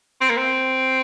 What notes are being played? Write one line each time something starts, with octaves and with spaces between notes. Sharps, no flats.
C4
A#3
C4